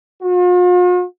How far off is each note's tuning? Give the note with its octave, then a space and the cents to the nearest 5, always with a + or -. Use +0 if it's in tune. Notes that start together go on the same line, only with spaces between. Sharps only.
F4 +45